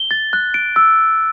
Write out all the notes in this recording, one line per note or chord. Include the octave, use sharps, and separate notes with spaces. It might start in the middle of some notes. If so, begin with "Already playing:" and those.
Already playing: G7
A6
F#6
D7
E6